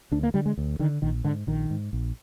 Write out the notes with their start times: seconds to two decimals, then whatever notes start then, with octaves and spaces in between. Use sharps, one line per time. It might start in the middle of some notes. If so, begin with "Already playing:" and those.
0.12 D2 D4
0.23 A#3
0.34 D3 G3
0.46 G#3
0.58 D2
0.79 D3 D#3
1.02 A#1 D#3
1.24 G#2 D3
1.47 A#1 D#3
1.70 G#2
1.93 A#1